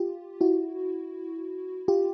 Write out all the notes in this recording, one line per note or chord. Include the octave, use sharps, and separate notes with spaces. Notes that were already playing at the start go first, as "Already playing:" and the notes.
Already playing: F4 G4
E4 F#4
F4 G4